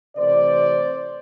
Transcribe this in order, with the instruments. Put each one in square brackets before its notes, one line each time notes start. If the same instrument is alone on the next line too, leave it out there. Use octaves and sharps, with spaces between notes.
[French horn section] C3 E3 A3 C5 D5